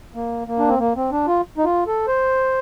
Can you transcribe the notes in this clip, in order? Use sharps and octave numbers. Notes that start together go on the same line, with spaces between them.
A#3
A#3
D4
C4
A#3
C4
D4
F4
D#4
F4
A4
C5